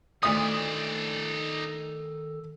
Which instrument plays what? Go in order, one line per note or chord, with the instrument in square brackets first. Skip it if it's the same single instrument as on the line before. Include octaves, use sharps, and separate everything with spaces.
[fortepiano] D2 D#6 [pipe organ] D#3 A4 [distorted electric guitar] D#4 D5